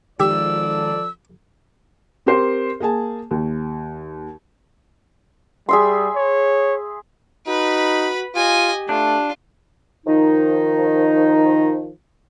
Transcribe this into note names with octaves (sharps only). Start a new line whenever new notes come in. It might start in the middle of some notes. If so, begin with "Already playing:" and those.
D#3 F3 G#3 G4 A4 D5 E6
C4 G4 A#4 C5
A#3 G#4 G#5 A5
D#2
G3 G#4 E5 C6
C#5
D#4 F#4 B4 B5
F4 G4 D#5 G#5
A3 D4 F4
D#3 F3 D#4